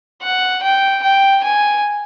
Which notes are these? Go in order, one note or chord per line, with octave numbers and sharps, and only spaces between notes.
F#5
G5
G5
G#5